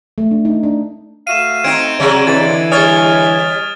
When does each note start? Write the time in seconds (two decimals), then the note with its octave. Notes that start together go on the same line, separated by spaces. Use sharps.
0.18 A3
0.31 D4
0.45 D#4
0.63 D4
1.27 A3 F#4 E5 F5 D#7 E7
1.64 C4 D#4 G#6 D7
2.00 C3 F#3 G#3 D5
2.27 D3 E3 A6
2.72 G3 C#5 G#5 D#6 F6 A6